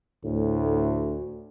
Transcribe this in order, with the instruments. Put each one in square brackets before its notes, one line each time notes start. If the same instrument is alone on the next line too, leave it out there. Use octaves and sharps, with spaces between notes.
[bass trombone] D2 [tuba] A2